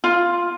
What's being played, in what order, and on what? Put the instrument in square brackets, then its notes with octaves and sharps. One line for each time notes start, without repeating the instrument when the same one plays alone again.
[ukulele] F4